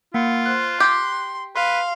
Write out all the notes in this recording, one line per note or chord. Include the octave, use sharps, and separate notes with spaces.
A#3 F4 F#5
C5 F#6
G4 C6
B4 F5 C6